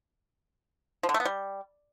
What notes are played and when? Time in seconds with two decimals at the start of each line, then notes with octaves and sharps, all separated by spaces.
1.03 F3
1.09 D3
1.14 A3
1.20 B3
1.25 G3